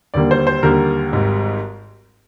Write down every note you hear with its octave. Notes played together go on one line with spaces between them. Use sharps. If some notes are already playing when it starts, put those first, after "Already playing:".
D#2 D3 G3 A#3 D5
C5
C5
D#2 D3 G3 A#3 A#4
G#1 G#2 G3